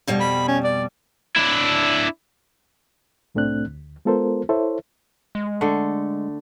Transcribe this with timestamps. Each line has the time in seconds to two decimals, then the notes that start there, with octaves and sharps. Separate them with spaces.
0.07 F2 B2 G3
0.20 B5
0.48 C#4
0.64 D5
1.36 D4 E4
3.35 C2 A2 A3 C4 D4 F#6
3.68 D2
4.05 G#3 B3 F4 A4 A#4 C5
4.49 E4 A4 C5 C#5 E5
5.35 G#3
5.61 D3 A3